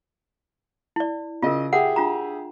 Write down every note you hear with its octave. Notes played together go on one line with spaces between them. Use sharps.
E4 D5
C#3 F4 A#4 D#5
G4 G#4 E5 F#5
D4 F4 A#5